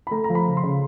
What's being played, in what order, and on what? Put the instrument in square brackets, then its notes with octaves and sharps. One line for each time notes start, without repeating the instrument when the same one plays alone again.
[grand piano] B5
A3 A#5
A#5
F3
B5
C#3
C6
C#3